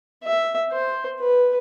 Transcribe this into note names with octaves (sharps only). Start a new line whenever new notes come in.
E5
C5
B4